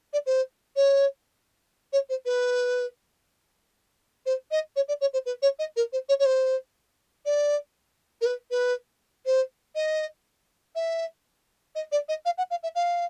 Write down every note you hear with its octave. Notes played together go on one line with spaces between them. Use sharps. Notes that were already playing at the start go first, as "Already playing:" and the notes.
D5
C5
C#5
C#5
C5
B4
C5
D#5
C#5
D5
C#5
C5
B4
C#5
D#5
A#4
C5
C#5
C#5
C5
D5
A#4
B4
B4
C5
D#5
E5
D#5
D5
D#5
F5
F#5
F5
E5
F5